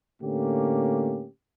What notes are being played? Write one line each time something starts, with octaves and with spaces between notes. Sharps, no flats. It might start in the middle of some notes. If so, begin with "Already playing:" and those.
A2 D3 A3 A#3 C#4 G4